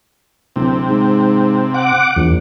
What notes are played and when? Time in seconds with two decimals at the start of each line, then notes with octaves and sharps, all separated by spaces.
0.56 D1 C3
0.87 G#2
1.74 F#5 D6
2.16 A#1 E2